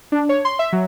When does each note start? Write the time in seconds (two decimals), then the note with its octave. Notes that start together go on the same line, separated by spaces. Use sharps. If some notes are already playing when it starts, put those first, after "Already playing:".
0.12 D4
0.29 C#5
0.45 C6
0.59 E5
0.73 F#3